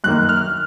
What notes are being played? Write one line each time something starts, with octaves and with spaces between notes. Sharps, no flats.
F#2 D#3 A#3 F#6
F6